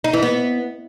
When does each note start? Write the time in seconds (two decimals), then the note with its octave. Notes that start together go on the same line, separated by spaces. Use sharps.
0.04 D#4
0.13 E3
0.23 B3